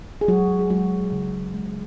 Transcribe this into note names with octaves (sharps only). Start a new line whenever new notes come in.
G#4
F#3 G#3 F#4
G#4
F#3 G#3 F#4
C#3
G#3